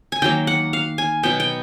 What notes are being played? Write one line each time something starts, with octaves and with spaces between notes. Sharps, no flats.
G#5
D#3 F#3 A#3 G5
F#5
F5
G#5
B2 F#3 B3 G5
G5